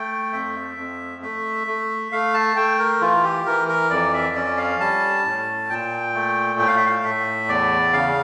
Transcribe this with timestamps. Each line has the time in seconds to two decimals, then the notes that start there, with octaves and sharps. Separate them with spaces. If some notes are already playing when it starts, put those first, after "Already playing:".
Already playing: A3 G5
0.33 F2 E5
0.77 F2
1.22 A3 E5
1.67 A3
2.12 A3 F5
2.34 A5
2.56 A3 G5
2.79 A#4
3.01 E3 F4
3.24 G4
3.46 E3 A#4
3.69 A#4
3.90 F2 D5
4.13 E5
4.35 C#4 D5
4.57 F5
4.80 G3 A5
5.25 A2
5.69 A#2 G5
6.14 A3
6.59 A2 G5
6.68 F5
6.77 E5
6.86 F5
7.04 A2 E5
7.48 E2 D5
7.93 C#3 F5